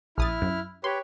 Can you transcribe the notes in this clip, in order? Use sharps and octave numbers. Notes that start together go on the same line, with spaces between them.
A#1 E4 D#6 F6 A6
F#2
G4 B4 C#5 C6